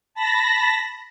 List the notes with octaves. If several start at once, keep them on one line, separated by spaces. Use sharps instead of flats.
A5 B5 A#6